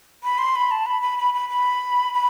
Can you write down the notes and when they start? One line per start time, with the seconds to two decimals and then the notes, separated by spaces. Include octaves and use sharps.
0.23 B5
0.38 C6
0.55 B5
0.71 A5
0.86 B5
1.02 B5
1.18 B5
1.34 B5
1.49 B5
2.14 B5